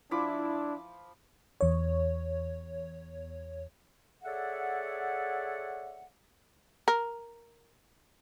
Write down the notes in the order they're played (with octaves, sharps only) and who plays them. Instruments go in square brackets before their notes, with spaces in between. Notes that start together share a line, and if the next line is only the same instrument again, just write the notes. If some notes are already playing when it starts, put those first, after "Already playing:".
[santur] F3 B5 D6 [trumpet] D4 [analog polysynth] E4
[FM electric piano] E2 C#5
[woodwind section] G#4 A4 C#5 D5 E5 F#5
[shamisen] A#4